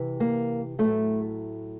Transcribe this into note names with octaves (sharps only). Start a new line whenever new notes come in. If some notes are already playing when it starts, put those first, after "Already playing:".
Already playing: C3 E3
A#3
A2 F#3 A3